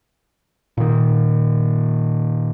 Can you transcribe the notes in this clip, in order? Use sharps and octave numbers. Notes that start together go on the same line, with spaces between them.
A#2 D#3